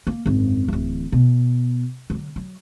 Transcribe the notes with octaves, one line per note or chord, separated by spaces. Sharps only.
A#3
G#1 F#2
D1 E3
B2
D3 F#3
F#3